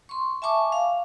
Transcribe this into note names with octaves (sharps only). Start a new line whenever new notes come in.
C6 C#6
E5 G#5 A5 C#6 D6
F5